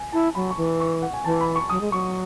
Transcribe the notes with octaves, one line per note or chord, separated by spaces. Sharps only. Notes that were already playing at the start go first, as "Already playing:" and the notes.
Already playing: G#5
E4 A5
F#3 B5
C#6
E3
C#6
F#5
G#5
E3 A5
B5
C#6
F#3 D#6
G#3
F#3 C#6